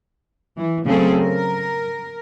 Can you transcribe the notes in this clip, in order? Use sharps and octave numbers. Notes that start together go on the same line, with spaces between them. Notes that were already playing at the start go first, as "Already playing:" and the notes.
E3
C#3 F#3 A3 C4 G#4 A4
A#4